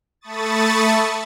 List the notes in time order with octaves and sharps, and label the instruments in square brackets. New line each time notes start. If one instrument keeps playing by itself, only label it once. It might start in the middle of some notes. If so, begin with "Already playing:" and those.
[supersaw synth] A3 A5 B5 C#6 D#6 A6